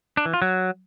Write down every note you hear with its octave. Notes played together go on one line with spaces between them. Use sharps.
D4
E3
F4
F#3